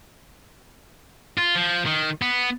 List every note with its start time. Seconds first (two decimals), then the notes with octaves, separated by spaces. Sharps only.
1.38 F4
1.56 F3
1.86 D#3
2.22 B3